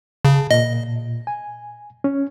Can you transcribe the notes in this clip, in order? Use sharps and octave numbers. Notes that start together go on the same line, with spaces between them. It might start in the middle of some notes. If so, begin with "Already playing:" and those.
C#3 G#4 A5
A#2 D#5
G#5
C#4